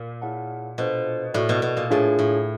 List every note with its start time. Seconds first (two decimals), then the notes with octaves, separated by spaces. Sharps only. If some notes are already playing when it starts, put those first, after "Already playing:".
Already playing: A#2
0.22 E4 G#4 C#5 F#5 A5
0.78 B2 D4 F4 A4 C5 F5
1.34 A2 F#4 A4 D5
1.49 B2
1.62 B2
1.77 A#2
1.90 A2 D4 F4 G#4 C#5 F5
2.19 A2